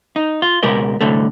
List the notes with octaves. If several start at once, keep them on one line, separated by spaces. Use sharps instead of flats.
D#4
F4
C#2 B2 G#3 G4 A#4 D#5
C2 A2 D3 A3